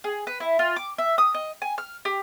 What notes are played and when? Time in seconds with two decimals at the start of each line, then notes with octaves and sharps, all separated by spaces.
0.04 G#4
0.27 B4
0.40 E4
0.59 F4
0.76 D6
0.98 E5
1.18 D#6
1.34 D#5
1.62 G#5
1.78 F6
2.05 G4